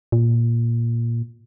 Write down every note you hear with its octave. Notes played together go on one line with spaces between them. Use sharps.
A#2